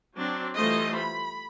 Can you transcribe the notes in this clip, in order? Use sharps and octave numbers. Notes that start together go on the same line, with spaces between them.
F#3 C4 D4
E3 G3 A3 F4 C5 D#5
B5